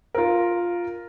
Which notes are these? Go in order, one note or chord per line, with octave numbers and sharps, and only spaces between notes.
F4 A#4